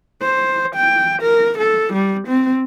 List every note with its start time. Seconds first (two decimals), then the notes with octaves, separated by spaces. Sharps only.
0.22 C5
0.75 G5
1.22 A#4
1.58 A4
1.93 G3
2.28 C4